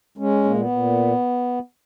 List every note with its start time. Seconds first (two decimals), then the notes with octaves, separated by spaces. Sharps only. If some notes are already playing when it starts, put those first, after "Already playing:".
0.18 G#3 C#4
0.44 A#2 A#3
0.56 B3
0.69 A#2